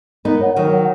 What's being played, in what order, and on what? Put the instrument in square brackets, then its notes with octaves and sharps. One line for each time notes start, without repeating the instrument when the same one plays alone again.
[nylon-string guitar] B3 D#4 [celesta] A#4
[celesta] C#5 F#5
[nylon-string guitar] D#3 F#3 [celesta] A#4
[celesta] C#5 F#5